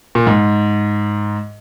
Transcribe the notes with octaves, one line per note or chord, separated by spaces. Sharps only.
A#2
G#2